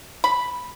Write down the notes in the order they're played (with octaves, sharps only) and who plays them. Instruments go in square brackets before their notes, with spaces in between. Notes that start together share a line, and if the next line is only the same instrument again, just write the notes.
[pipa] B5